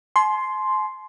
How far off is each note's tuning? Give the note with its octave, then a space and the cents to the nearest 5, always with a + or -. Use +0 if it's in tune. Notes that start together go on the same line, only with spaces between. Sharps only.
G#5 +45 C6 +0